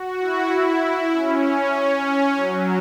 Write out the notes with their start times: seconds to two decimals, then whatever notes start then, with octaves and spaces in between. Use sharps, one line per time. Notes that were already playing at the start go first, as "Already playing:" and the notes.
Already playing: F#4
0.20 E4
1.12 C#4
1.75 C#4
2.36 F#3